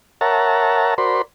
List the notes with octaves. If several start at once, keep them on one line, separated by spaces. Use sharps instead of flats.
A#4 C#5 E5 F#5 A5 A#5
F#4 A#4 C5 D5 B5 C6